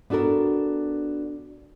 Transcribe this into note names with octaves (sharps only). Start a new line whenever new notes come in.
B3 D4 F#4 A4 A#4